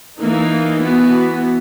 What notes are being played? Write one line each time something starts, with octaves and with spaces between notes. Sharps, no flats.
E3 A#3 D#4
E3 B3 F#4